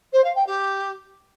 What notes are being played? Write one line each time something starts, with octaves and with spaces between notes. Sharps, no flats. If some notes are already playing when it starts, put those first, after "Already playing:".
C5
F5
G5
G4